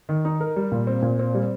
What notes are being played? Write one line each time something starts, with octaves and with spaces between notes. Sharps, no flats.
D#3
D#4
A#4
G3
A#2
C4
A#2
C4
G3